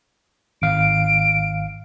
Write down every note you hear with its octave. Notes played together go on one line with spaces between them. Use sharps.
G#1 F5 D7